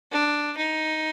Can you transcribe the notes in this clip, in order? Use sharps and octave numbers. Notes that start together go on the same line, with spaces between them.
D4
D#4